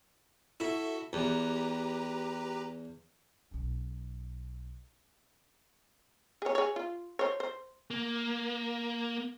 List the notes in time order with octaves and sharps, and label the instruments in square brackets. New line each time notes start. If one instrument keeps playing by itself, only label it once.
[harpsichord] E4 [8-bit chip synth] F#4 A4 E5
[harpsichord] E2 [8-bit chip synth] G4 B4 A#5
[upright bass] B1 C#4
[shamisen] G#4 C#5
G#4 C#5
F4
C5 C#5
C5
[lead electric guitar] A#3